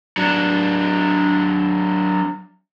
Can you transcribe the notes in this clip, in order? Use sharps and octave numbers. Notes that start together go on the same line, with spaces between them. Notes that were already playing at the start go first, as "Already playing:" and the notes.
F#3 D4